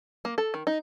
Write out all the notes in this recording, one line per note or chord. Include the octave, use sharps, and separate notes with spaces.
A#3
A4
D#3
D#4